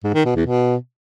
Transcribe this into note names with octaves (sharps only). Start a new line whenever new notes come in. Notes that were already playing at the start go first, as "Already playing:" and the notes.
G#2
D#3
B2
E2
B2